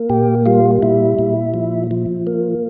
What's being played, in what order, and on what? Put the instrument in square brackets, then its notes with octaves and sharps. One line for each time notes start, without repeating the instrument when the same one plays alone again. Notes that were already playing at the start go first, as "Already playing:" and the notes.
Already playing: [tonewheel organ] A#3
A#2 G4
G3 F4
A#2 E4
A#2
F3
F3
A#3